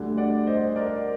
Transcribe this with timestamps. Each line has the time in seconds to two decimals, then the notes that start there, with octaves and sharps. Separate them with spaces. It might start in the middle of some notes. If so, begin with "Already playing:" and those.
Already playing: D2 D3 G3
0.17 D5 F#5
0.47 C5 D#5
0.76 A#4 D5